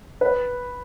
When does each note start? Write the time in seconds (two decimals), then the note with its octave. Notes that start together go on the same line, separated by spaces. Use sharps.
0.21 B4